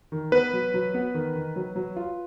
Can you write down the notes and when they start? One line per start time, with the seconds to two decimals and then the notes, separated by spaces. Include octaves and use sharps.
0.12 D#3
0.32 B3 B4
0.53 F#3
0.74 F#3
0.94 B3
1.14 D#3
1.35 D#3
1.56 F#3
1.76 F#3
1.96 F4